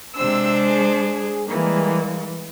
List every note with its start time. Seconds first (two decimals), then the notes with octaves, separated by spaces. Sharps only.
0.17 C3 G#3 D4 C5 E6
0.68 G#4
1.48 E3 G3 G#3 A#3